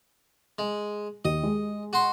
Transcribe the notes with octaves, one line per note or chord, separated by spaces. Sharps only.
G#3
D#2 D#5
G#3
F#4 C6